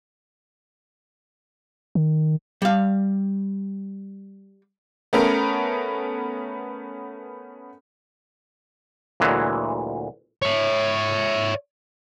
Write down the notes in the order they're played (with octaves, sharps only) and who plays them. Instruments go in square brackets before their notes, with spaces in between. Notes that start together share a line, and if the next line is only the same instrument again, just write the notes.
[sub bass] D#3
[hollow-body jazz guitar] G3 F5
[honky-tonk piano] A3 B3 C#4 A#4
[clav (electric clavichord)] D2 A#2 E3 F#3 G#3
[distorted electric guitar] C#5 E5